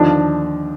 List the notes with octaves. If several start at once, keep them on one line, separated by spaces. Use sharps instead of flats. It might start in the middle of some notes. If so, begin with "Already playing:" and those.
Already playing: D#2 D3 F3 D4